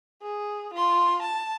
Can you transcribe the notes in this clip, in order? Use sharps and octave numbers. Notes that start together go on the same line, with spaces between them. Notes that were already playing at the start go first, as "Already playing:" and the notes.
G#4
F4 C6
A5